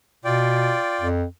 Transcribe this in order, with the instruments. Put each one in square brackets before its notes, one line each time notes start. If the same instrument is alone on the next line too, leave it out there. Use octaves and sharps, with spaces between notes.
[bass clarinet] B2 [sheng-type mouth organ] F4 D5 G5
[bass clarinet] F2